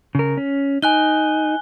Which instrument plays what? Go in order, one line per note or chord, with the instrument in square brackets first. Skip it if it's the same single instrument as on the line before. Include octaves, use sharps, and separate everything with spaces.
[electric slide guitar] C#3 A#4
C#4
[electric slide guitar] D#4 [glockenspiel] G#5 F#6 G7